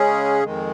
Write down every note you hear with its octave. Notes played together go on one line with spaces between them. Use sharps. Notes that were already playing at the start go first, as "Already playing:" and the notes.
Already playing: C#3 G#3 C#4 G#4
F2 D#3 G#3